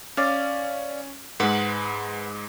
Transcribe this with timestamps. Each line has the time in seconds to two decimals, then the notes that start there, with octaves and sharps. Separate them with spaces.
0.17 C#4 D5 F5
1.40 G#2 G#3 B4 F#5